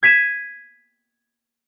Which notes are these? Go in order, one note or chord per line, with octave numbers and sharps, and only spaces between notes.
G#6 B6 D#7 E7